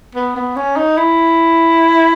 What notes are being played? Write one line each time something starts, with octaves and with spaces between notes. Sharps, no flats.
B3
B3
C#4
D#4
E4